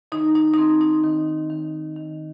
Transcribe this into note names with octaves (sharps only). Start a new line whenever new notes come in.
D#3 D#4
D#4
D#4
D#3 C4
D#4
D#3
D#3
D#3